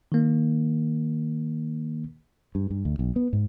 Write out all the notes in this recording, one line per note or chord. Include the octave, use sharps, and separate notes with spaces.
D#3 A#3
G2
G2
D2
B1
B3
G#2